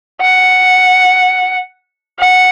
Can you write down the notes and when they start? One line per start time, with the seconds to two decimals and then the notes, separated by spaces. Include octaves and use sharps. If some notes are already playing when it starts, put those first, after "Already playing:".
0.21 F#5
2.19 F#5